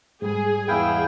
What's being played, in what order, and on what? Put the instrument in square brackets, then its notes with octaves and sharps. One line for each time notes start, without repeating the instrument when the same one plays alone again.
[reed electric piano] G#2 G3 [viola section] G#4
[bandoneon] E2 G5 [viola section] G#4 [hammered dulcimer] E5 F5 B5